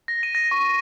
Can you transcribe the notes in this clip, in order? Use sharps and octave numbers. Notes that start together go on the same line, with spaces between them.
A#6
D#7
A#6
C#6